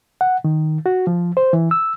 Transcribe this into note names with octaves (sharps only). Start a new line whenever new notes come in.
F#5
D#3
F#4
F3
C5
E3
E6